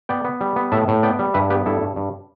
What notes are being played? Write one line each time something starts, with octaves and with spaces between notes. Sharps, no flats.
B3 D5 G5
B3
G3
B3
A2 E5 A5
A2
B3 D5 G5
G3
G2 B4 E5
B3 G4 B4
G2 E4 A4
G2
G2